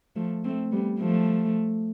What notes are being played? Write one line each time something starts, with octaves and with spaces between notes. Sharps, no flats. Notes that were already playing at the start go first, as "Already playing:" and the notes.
F3 A3
A3 C4
G3 B3
F3 A3